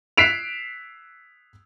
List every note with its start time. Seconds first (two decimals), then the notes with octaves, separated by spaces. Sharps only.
0.17 F#6 B6 C7 D7 E7 F7